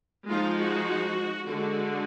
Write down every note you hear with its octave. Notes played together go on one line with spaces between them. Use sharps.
F3 G#3 D#4 F4
F#4
D3 G#3 D4 F#4